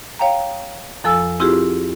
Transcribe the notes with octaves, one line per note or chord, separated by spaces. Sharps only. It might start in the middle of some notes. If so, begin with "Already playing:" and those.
C#5 F5 G5 A#5
F2 F3 A4 G#5 E6
C4 E4 F4 G4 G#4